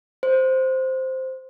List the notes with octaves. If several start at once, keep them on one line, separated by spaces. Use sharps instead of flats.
C5